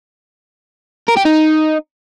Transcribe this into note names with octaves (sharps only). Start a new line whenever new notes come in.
A#4
G4
D#4